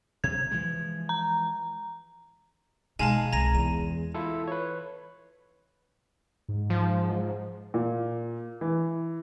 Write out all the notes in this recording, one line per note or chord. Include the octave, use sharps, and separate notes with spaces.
C3 G#6
E3 F3 G#3
A#5
B2 G#3 D#4 F5 G#5 A5
C2 G#5 A#5 A#6 D#7
E2 E3 D#7
E4 F4 A4
B4 C#5
G#2
F3
A#2
E3